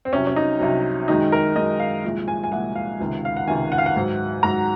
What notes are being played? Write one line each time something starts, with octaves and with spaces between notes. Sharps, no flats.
C4
C2 C3 F#3 C#4
C#4
D#4
C2 C3 F#3
F#2 D#3 G#3 D#4
A#4
F#2 D#3 G#3 D#5
F5
C2 A#2 F3 G#3
G#5
G#5
C2 A#2 F3 G#3 F#5
F5
C#2 C3 D#3
F5
F#5
C#2 C3 D#3 G#5
F#5
F5
F#5
G#2 F#3
G#2 F#3 A#5